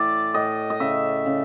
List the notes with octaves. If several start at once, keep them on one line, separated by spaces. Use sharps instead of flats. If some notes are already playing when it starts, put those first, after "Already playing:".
Already playing: A2 E3 D5 E5
A2 D#5
D#5
C#3 E5
C#3